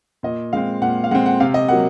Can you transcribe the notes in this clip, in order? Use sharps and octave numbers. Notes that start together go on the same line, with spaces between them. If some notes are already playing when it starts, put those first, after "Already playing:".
A#2 D#5
G#3 C4 F5
A#2 F#5
F5
G#3 C4 F#5
F#5
C3 F5
D#5
F#3 A#3 F#5